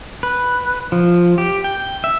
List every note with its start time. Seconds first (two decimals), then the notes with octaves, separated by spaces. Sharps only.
0.23 B4
0.92 F3
1.38 G4
1.64 G5
2.04 E5